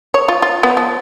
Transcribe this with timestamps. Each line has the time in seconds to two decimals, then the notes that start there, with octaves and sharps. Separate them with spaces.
0.14 C#5
0.28 F4
0.42 F4
0.63 B3
0.77 F3